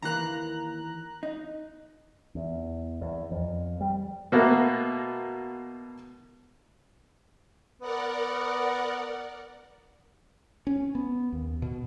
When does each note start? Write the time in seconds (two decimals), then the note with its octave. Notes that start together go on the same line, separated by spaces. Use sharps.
0.02 D#2 E3 A#3 A#5 F#6
1.23 D#4
2.35 E2
3.01 E2
3.31 F2
3.81 G3
4.32 B2 A3 A#3 F#4
7.81 B3 A#4 D5 F#5
10.67 C#4
10.95 B3
11.32 D#2
11.62 B2